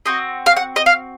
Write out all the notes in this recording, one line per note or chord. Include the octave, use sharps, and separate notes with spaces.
C4 F#4 D#5
F5
F#5
D#5
F5